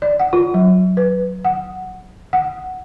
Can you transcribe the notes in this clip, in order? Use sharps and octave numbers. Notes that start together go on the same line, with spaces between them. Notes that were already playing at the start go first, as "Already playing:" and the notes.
D5
F#5
F4
F#3
B4
F#5
F#5